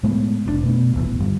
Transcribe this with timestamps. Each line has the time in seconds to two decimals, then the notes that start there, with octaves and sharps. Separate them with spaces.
0.03 A2 G#3 A3 B3
0.45 F1 A#2 D4
0.64 B2 A3 B3
0.93 D#1 A1 E2
1.20 G1 G3